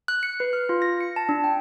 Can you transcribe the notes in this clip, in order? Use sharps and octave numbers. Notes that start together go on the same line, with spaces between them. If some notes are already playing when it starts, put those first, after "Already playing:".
F#6
C#7
B4
F6
F4
A#6
C#7
A5
D4
G5